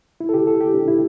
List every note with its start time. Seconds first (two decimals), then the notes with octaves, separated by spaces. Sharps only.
0.20 E4
0.29 A4
0.34 G4
0.47 A4
0.61 G4
0.74 D4
0.88 E4